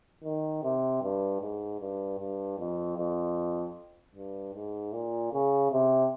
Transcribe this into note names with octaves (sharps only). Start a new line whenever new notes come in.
D#3
C3
G2
G#2
G2
G2
F2
F2
G2
G#2
A#2
C#3
C3